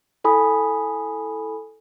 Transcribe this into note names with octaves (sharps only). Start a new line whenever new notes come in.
E4 A4 G#5 B5 D#6